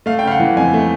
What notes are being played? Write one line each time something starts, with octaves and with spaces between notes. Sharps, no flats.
A3 F5
G5
C#3 F5
F#5
E3
F2 G#5
A3